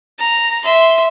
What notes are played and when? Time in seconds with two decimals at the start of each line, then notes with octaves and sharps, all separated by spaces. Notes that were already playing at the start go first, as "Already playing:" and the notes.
0.19 A#5
0.65 E5 C6